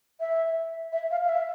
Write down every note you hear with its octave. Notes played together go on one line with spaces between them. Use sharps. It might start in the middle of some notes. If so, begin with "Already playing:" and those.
E5
E5
F5
F5
E5